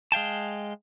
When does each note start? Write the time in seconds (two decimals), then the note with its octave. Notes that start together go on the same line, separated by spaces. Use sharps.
0.12 G#3 F5 G5 A5